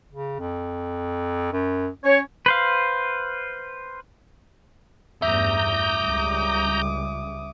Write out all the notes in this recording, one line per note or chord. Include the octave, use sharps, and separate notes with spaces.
C#3
F2
F#2
C#4 C#5
B4 C5 F5
A1 E2 G2 E5 A#5 D6 D#6 G6
C#2 C#3 G3